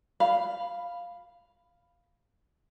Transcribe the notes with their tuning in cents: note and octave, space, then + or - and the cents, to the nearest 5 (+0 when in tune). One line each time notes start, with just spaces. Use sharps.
F5 +0 B5 +0